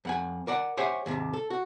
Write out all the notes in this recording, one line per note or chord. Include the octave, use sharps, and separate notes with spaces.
F2 F#5 G#5
A#4 D5 F#5
G4 C5 C#5 E5 F#5 G#5
D#2 G#2 C3
A4
F#4